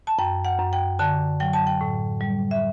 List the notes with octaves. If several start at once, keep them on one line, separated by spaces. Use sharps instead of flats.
A5
F#2 G5
F#5
F#2
G5
D3 A5
F#3 G5
A5
G5
A2
G3
E5